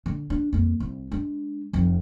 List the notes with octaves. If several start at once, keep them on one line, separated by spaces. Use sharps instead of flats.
D3
D4
F2 A#3
C2
G#3 D4
F1 F2